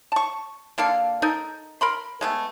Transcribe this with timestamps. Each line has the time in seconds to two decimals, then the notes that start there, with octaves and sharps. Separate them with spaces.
0.12 A5 C#6
0.78 D3 A#3 A4 F5
1.22 D#4 A4 A#4
1.81 A#4 B5 C6
2.21 G#3 A3 B3